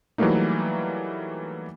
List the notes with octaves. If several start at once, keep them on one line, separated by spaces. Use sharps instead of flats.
E3 F#3 G3 A3 A#3 D#4